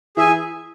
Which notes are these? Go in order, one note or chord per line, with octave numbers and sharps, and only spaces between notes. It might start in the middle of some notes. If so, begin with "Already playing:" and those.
E3 G#4 E5 G#5